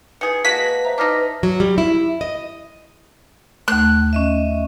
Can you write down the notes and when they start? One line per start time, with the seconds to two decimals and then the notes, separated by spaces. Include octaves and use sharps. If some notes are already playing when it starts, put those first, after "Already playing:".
0.21 D#3 G#4 B4 C#7
0.45 G#3 A#3 F#4 A5 A#6 B6
0.85 C5 E5 A#5
0.98 D4 D#4 D6 F6 A#6
1.43 F#3
1.60 G3
1.78 E4
2.21 D#5
3.68 D#2 A3 F#6
4.13 C#4 D#5 E5